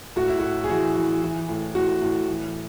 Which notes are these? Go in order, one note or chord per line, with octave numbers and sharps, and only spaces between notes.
A2 F#4
E4
A2 F#4
G#4
E3 F#4
E3
E3
A2
A2 F#4
A2
E3